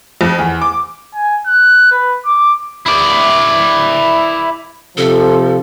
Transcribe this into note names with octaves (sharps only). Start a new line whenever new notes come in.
F2
E2
D6
G#5
F#6
B4
D6
E4 D5
C3 F3 A4